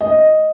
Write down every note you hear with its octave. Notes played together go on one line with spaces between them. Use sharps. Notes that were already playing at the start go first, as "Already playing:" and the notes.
D#5